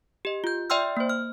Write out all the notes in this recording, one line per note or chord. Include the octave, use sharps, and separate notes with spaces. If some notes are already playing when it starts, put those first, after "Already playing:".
G4 D#5
F4 G6
D5 E5 G5 C6 E6 F6
A#3 C5
F6